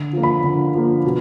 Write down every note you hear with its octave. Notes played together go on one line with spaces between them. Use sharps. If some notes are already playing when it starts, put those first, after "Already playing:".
Already playing: D3
F3 A#3
B5
D3
F3 A#3
B2